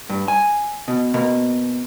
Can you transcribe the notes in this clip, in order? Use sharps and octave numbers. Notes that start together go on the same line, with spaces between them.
G2
G#5
B2
B2 A#3